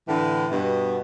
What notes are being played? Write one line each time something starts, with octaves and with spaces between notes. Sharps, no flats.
A2 D3 E3
G2 B2